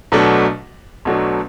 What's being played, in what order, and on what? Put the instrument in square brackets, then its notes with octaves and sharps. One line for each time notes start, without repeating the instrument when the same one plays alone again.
[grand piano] B1 B2 F#3 A3 D4
B1 B2 F#3 A3 D4